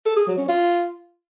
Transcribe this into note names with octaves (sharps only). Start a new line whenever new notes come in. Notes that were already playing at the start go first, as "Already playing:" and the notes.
A4
G#4
F#3
C#4
F4